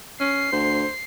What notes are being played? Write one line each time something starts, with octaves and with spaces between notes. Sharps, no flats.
C#4 C7
D2 C5